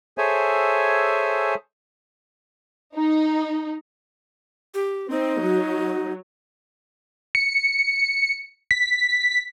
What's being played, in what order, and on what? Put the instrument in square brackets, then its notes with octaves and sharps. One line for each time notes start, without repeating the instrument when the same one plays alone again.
[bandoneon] G#4 A4 C5 C#5 E5 G#5
[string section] D#4
[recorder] G4
[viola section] C4 [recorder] D#4
[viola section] F#3
[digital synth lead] C#7
B6